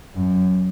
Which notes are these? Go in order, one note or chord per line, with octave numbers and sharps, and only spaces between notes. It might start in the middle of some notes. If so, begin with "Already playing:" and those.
F#2